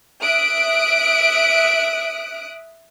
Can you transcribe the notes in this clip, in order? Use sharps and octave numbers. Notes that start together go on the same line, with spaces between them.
E5 D#6 F#6 D7